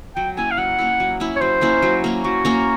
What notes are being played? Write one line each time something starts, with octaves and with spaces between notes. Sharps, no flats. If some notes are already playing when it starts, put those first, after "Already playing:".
F#3 G5
A#3 C#4 E4 G#5
F5
F#3 F#5
A#3 C#4 E4
F#3
A#3 C#4 E4
C#5
F#3 C5
A#3 C#4 E4
F#3
A#3 C#4
F#3 F#4
A#3 C#4